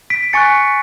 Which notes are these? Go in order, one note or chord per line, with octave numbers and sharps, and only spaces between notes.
B6 D7
G#5 C#6 F#6 A6 C#7